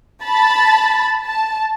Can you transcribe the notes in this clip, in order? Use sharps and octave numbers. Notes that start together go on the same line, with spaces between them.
A5 B5 A6
A5